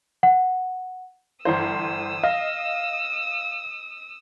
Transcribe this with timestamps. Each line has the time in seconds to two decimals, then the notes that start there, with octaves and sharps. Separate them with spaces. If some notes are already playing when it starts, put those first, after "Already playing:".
0.23 F#5
1.45 G1 E3 C5 D#6 E6
2.24 D#5 F5